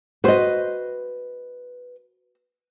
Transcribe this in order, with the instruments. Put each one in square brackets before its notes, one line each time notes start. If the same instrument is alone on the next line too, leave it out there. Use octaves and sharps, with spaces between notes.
[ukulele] F#4 C5 [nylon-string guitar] B4 D#5